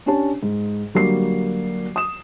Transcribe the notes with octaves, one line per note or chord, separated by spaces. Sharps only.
C#4 D4 G4 C#5 A5
G#2
D3 F#3 G3 A#3 C7
D#6 E7